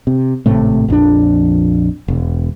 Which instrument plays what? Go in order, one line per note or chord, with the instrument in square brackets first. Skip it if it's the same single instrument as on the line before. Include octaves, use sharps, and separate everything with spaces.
[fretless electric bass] C3
G#1 A2 C3 A3
A#1 F2 D#3 D4
E1